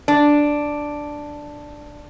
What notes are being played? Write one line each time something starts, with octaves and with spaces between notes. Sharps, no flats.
D4